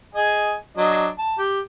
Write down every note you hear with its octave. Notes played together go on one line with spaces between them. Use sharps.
G#4 D#5 G#5
F#3 D4 D#5
A5
G4